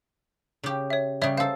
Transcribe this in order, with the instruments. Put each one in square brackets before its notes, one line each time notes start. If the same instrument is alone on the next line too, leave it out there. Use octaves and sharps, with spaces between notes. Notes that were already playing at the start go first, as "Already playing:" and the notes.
[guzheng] C#3 G4
[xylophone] C#5 E5
[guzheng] C#3 G3 [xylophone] C#5 E5
[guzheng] A4 C5 [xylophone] F5